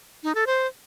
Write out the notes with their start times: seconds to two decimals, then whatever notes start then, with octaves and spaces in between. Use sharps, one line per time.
0.23 D#4
0.35 A4
0.47 C5